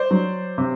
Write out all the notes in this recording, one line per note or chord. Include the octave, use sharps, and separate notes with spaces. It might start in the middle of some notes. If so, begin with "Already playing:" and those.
Already playing: C5 D5
F#3
C3